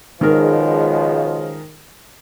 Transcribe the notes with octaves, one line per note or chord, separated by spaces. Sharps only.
C#2 B2 D#3 F3 G#3 A#4